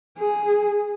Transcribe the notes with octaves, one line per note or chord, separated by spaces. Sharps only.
G#4